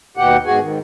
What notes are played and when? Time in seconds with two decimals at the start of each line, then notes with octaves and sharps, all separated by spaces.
0.17 D#2 B2 G4 F#5
0.46 G#2 B2 F#4 G#4 G#5
0.61 G#2 D#3